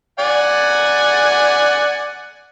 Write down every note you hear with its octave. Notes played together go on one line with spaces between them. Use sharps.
D5 F#5 G#5